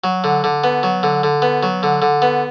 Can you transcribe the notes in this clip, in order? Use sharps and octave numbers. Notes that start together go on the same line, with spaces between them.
F#3
D3
D3
B3
F#3
D3
D3
B3
F#3
D3
D3
B3